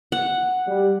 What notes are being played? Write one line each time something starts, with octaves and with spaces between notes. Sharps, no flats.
F#5
G3